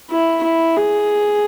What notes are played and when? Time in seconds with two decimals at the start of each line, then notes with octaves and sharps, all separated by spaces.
0.10 E4
0.44 E4
0.77 G#4